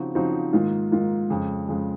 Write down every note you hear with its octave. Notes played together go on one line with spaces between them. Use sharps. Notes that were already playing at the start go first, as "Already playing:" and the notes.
Already playing: C#3 F3 C4 D#4 F#4
C#3 F3 C4 D#4 F#4
G#2 D#3 A#3 F4
G#2 D#3 A#3 F4
F2 C#3 G#3
F2 C#3 G#3